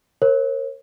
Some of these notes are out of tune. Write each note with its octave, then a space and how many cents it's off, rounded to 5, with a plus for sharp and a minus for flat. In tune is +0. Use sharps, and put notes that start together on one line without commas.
A#4 +0 C#5 -45